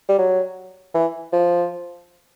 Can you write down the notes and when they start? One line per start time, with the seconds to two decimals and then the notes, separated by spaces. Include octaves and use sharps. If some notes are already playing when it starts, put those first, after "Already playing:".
0.09 G3
0.18 F#3
0.94 E3
1.33 F3